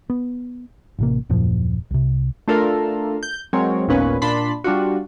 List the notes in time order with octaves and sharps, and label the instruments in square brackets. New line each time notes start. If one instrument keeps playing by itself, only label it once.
[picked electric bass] B3
A1 C3 A#3
D#1 F#2 A#2 F3
C2 C3
[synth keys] A3 D4 F4 A4 A#4 F5
G6
F#3 G#3 C4 A#4 C#5
G#1 D#2 A#2 B3 C#4 B4
A#2 D4 A5 B5 C6
G3 D4 F4 F#4